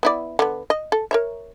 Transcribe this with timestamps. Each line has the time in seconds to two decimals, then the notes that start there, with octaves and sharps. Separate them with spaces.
0.03 B3 E4 D5
0.39 D3 B3
0.70 D#5
0.92 A4
1.11 A#4 C#5 E5